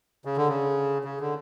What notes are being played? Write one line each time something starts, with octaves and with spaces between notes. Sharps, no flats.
C#3
D3
C#3
C#3
D3